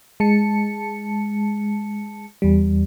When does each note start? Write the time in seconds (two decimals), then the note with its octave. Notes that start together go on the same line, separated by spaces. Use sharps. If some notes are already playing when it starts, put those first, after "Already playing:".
0.20 G#3 A5 C#7
2.42 E2 G3